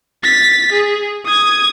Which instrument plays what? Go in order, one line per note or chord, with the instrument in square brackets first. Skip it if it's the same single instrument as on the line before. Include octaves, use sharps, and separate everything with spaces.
[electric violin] A6 B6
G#4
D#6 G#6